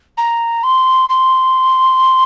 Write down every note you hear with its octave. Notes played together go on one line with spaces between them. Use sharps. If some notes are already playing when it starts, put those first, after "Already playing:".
A#5
C6
C6